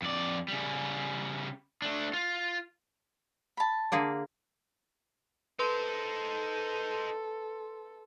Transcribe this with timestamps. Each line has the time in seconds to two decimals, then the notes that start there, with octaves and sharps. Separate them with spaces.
0.02 F2 D5
0.48 C#3 G3
1.82 A3 D4
2.13 F4
3.57 A5 B5
3.92 D3 A#3 G#4
5.59 D#4 A4 B4 C5 C6